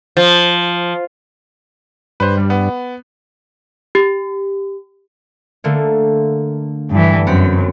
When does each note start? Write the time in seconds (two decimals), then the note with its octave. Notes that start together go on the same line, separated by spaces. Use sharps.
0.17 F3
2.20 G2 B4 C5
2.37 G3
2.50 B3
3.95 G4
5.64 D3 A3 A#3
6.91 G2 E3
7.27 F#2 B3 C4 B6